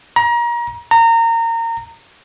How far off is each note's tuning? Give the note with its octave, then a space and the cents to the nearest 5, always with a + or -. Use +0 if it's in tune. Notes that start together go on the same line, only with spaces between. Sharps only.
A#5 +30
A#5 -25